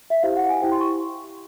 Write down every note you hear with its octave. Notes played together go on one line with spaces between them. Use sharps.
E5
E4 G4 C5 F5
F#5
G#5
E4 G4 C5 G5
C6
C#6